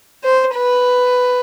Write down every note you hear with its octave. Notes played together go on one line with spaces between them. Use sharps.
C5
B4